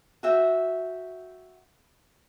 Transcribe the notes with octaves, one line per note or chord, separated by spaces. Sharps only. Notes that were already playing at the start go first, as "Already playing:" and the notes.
F#4 E5 G5